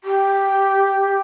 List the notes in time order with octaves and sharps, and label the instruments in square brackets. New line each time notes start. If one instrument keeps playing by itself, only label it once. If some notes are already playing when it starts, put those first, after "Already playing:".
[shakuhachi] G4